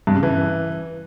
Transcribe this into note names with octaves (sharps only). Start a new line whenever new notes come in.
G2
C#3
E3